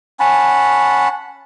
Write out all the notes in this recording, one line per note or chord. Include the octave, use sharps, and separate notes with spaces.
C#4 F#5 A5 B5